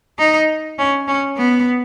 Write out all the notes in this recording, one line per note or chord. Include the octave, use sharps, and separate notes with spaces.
D#4
C#4
C#4
B3